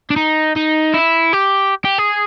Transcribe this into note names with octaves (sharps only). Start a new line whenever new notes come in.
D4
D#4
D#4
E4
G4
G4
G#4